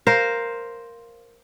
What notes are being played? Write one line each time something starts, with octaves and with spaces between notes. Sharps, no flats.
A#4 C5 F5